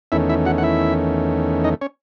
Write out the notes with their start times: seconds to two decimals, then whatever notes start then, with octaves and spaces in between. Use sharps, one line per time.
0.12 E2 D#3 A3 C#4 E4 E5
0.29 E4 E5
0.46 F#4 F#5
0.58 F#5
0.63 E4 E5
1.64 D#4 D#5
1.81 C#4 C#5